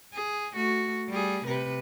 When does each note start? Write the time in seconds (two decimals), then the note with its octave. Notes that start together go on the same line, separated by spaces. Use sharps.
0.14 G#4
0.53 A3 F#4
1.09 G3 G#4
1.46 C3 B4